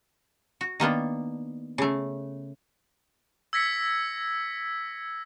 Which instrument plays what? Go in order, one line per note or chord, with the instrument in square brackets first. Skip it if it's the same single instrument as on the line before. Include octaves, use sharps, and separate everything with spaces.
[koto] F#4
D#3 A#3 B3 D4
C#3 A3
[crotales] E6 G#6 A#6 B6 C#7